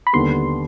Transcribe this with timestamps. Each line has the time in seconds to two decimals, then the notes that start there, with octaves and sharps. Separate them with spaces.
0.07 B5
0.13 D#2 D3 G3 B3 C6